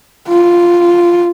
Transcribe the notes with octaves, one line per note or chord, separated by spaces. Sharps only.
F4